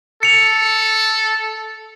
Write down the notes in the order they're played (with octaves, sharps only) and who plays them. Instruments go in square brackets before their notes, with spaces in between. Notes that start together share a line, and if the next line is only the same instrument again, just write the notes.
[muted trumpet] A4 [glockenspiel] C#7 F7